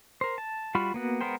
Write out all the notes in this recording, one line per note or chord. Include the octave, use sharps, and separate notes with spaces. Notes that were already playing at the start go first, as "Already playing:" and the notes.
A#4 C5
A5
G3 F4 F#4 B5 F6
A#3 B3 F#4
G#3 B3 A#4 C5 G5